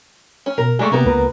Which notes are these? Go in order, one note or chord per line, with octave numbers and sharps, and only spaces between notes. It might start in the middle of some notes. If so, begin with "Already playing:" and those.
C#4
B2 A#4
G#3 A3 G#4 D5 C#6
C3 A#3 B3
C#2 B4 A#5